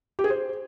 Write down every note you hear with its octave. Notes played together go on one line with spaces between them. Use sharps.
G4
G#4
C5